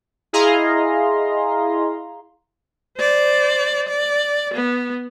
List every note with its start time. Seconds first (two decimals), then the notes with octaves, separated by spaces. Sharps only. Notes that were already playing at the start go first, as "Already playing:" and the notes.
0.33 E4 G#4 D#5 F5 A#5 C6
2.98 C5 D5
3.88 D5
4.54 B3